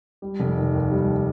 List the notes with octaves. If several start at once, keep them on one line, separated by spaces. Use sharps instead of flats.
G3
F1
D#3
D#2
G3